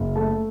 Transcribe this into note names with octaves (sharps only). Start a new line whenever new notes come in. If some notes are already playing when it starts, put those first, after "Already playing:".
Already playing: F#1
A3 A5